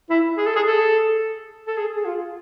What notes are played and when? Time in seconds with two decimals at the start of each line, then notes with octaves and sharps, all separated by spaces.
0.09 E4
0.37 G#4
0.46 A4
0.56 G#4
0.66 A4
1.67 A4
1.77 G#4
1.97 G#4
2.05 F4